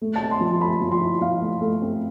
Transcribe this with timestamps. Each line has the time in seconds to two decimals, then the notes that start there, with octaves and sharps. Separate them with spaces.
0.02 A3
0.16 A5
0.21 C4
0.31 C6
0.41 F3
0.46 A5
0.61 A3 B5
0.81 F3
0.92 C6
1.01 E4
1.21 F3 F5
1.41 A3
1.61 A3
1.82 C4